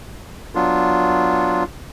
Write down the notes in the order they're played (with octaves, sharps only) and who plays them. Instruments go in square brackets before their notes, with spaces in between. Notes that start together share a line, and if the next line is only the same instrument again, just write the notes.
[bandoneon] F#3 B3 D4 F4